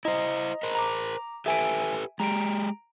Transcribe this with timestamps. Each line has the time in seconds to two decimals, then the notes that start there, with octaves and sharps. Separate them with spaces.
0.05 E4 C5 D#5 A#5
0.63 A#4 C5
0.75 A#5 D6
1.46 G4 A4 B4 E5 G#5 D7
2.20 G#3 G4 A#5 D7